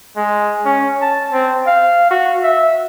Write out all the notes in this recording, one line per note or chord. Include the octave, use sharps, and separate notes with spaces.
G#3
C#4
A5
C4
F5
F#4
E5